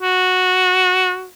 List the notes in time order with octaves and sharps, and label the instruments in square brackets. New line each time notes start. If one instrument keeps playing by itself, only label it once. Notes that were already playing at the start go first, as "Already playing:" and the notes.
[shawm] F#4